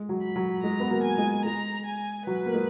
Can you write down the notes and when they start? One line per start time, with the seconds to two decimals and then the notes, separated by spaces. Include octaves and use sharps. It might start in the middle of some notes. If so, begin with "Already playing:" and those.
Already playing: G#3
0.09 F#3
0.23 B5
0.36 F#3
0.63 G#3 A#5
0.80 B3
0.90 F#3 A#3
1.03 G#5
1.18 G#3
1.45 G#3 A#5
1.86 G#5
2.26 F#3 B4
2.46 A#3
2.54 G#3